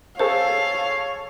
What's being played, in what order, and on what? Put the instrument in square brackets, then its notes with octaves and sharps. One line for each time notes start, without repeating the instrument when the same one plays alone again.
[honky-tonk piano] G#4 A4 [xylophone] C5 [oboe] C#5 [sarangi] F5